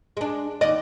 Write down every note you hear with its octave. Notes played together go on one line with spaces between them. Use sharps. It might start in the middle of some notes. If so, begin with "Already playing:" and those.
G#3 D4
D#2 D5 D#5